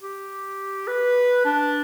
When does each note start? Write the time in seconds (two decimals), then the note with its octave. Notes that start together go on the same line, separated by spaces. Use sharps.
0.01 G4
0.88 B4
1.45 D4